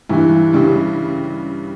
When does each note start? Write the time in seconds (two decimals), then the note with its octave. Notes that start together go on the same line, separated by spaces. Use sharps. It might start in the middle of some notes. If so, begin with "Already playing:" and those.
0.09 G2 E3
0.53 G2 C#3 G3